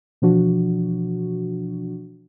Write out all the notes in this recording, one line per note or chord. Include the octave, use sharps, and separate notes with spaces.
B2 E3 F3 D4 F#4